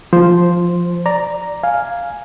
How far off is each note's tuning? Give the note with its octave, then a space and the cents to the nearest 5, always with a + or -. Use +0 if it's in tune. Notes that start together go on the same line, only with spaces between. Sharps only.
F3 +0 C5 +0
D5 +0 A#5 +0
F5 +0 G#5 +0